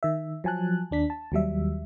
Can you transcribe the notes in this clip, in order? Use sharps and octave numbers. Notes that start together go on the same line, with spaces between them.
D#3 E5
F3 F#3 G#5 A5 F#6
D#2 D4 B6
A5
D#2 F#3 G3 E5